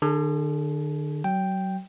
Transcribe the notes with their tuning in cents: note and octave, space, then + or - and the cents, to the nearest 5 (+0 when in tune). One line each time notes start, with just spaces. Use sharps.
D3 +40 G#4 +0 A5 -35
F#3 +25 G5 +0